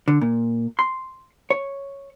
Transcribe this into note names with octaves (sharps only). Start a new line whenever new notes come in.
D3
A#2
C6
C#5